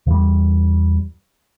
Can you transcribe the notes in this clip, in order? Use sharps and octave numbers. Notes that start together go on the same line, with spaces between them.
E2 G3